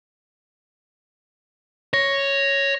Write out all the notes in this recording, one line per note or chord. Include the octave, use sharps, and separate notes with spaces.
C#5 A#6